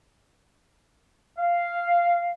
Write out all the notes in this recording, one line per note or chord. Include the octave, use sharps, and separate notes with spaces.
F5